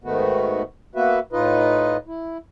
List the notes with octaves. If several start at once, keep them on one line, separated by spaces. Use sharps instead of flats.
G#2 D#3 A3 B3 F#4
A#3 B3 F#4 B4 E5
A2 D#4 F4 B4 D#5
E4